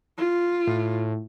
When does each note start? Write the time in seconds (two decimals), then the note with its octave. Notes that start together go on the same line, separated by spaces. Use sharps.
0.18 F4
0.67 A2